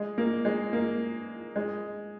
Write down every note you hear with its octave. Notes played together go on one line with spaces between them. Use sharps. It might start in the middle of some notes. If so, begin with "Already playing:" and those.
Already playing: G#3
A#3
G#3
A#3
G#3